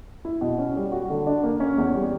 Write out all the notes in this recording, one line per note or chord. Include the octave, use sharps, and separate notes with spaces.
E4
B2
C#4
G3
F#4
D3
D4
A#3
C#4
E2
G3